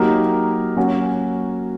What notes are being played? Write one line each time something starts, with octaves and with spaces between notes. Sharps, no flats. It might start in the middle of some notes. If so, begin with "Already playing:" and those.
Already playing: F#3 A#3 D#4 G4 A#4
F#3 A#3 C#4 F#4